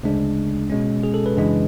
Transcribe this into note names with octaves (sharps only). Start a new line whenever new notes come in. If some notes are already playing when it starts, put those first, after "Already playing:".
D2 C#3 G#3 D4
B2 G#3 C#4
G#4
A4
B4
F#2 C#3 E3 G#3 D4